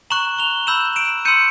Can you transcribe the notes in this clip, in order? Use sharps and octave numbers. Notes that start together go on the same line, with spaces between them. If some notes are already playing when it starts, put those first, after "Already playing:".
A#5 C#6 F#6 E7 F#7
F7 G7
B5 E6 G6 E7 F#7
D7 E7
C6 E6 G6 C#7 D#7